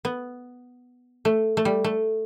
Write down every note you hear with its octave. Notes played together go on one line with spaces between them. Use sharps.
B3
A3
A3
G3
A3